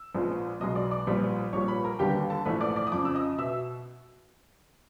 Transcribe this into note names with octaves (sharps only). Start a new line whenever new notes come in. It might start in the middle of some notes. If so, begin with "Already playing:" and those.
Already playing: E6
A#1 A#2 F3 G#3 B3
B1 B2 G#3 B3 D#5 D#6
D5 D6
D5 D6
A#1 A#2 G3 B3
A#1 A#2 G3 C#5 C#6
B4 B5
A#4 A#5
D#2 D3 G3 B3 G4 G5
A4 A5
A#1 G#2 E3 A3 B4 B5
D5 D6
D5 D6
D#6
F2 C#3 F3 D5 D6
E6
D#5 D#6
B2 E5 E6